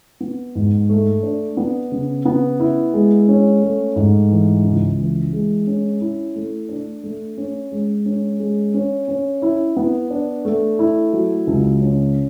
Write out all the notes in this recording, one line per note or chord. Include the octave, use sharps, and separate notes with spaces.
B3
G#2
A3
D4
B3
C#3
B3
E4
G#3
C#4
A3
G#2
E3
C#2
E3
G#3
C#4
E4
A3
D4
A3
C#4
G#3
C#4
G#3
C#4
C#4
E4
B3
D4
A3
E4
F#3
C#2
C#4